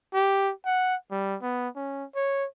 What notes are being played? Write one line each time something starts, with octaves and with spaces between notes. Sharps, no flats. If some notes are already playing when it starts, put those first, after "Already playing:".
G4
F#5
G3
B3
C#4
C#5